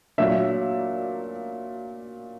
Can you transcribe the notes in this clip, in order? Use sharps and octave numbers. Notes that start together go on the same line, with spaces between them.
A#2 F#3 A#3 D4 E5